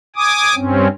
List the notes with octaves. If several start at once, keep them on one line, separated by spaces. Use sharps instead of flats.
G#5 D6 D#6
G2 C4 C#4